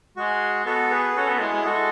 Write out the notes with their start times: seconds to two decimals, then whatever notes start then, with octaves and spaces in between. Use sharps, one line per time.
0.16 G#3 F#4
0.66 B3 F#4 A4
0.91 G#4 B4
1.16 C#4 F#4 A4
1.28 B3
1.37 A4
1.40 G#3 E4 G#4
1.52 G#3
1.65 G#3 F#4 A4